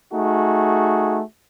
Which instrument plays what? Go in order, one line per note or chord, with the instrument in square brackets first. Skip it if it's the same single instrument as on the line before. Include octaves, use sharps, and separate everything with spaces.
[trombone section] A3 D#4 F#4 G#4